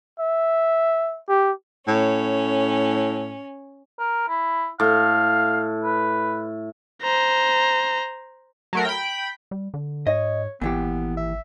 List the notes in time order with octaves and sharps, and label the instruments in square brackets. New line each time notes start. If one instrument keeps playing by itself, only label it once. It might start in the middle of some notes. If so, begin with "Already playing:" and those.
[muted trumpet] E5
G4
[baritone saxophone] A2 [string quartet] C#4
[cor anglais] A#4
E4
[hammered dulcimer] A2 [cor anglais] F5
[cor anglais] B4
[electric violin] C5 A#5
[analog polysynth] F#3 A3 A#4
G5 B5
[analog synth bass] G3
D3
[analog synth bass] G#2 [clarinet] C#5 [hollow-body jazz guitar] D#5
[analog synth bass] G#1 [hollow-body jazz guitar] A#2 E3 G4 [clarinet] B3
[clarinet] E5